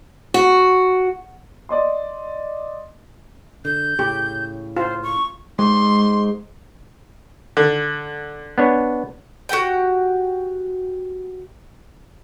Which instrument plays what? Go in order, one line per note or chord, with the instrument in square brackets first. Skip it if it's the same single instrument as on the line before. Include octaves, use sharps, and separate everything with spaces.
[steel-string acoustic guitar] F#4
[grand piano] D5 D#5 C6
[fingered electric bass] D3 [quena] G6
[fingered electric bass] A2 C#3 [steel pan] G4
[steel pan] F4 [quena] C5
[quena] C#6
[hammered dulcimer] G#2 [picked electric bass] G#3 [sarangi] C6
[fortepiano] D3
[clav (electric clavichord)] B3 D4 C#5
[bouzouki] F#4 G4 F#5 G5